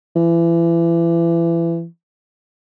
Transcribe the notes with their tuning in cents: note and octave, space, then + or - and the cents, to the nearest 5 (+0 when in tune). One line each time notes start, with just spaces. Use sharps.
E3 +30